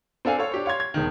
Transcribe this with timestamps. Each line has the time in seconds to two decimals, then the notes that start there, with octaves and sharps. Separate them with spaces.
0.25 C4 D4 A4 F5 G#5
0.39 A4 C5 C#5 F5
0.52 D4 G4 C#5
0.66 C#5 F5 C6 G#6
0.80 G#6
0.94 E1 D#3